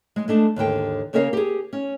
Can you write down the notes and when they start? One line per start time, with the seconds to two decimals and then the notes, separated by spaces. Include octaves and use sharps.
0.16 G#3
0.28 G#3 A3 D4
0.56 D#2 G#2 D3 G5
1.13 C#3 A#3 C#4 A#4 E5 F5
1.33 G4 G#4
1.73 C#4